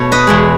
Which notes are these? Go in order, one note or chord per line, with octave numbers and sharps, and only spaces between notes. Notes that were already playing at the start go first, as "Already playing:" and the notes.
Already playing: B2 A3 C#5
B4 D#5
E2 B2 G#3